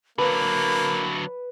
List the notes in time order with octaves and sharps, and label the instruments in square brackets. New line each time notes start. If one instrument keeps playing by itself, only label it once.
[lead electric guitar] D3 F#3 [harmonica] A#3 [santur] B4 [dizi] B5